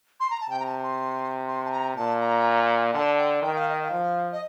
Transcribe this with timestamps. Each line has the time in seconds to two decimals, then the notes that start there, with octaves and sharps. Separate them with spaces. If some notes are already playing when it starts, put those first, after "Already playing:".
0.20 C6
0.31 A#5
0.41 A5
0.50 C3 G5
0.60 A#5
0.66 A5
0.83 C6
1.48 C6
1.65 A5
1.72 A#5
1.96 A#2 A5
2.21 A#5
2.94 D3 A5
3.18 G5
3.42 D#3 G5
3.56 F5
3.69 D#5
3.83 F5
3.91 F3
4.32 D#5